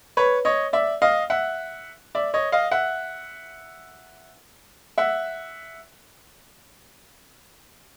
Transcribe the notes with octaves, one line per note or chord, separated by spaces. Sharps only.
B4 C#5
C#5 D#5
D5 E5
D#5 F5
E5 F#5
D5 E5
C#5 D#5
D#5 F5
E5 F#5
E5 F#5